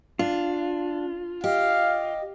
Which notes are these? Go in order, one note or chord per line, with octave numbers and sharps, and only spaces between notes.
D4 F4
G4 D#5 F5